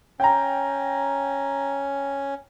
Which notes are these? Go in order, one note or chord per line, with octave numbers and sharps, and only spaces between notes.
C#4 G5 A#5